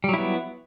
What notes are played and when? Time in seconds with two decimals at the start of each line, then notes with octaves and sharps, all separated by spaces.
0.04 G3
0.09 F#3
0.14 E4
0.18 B3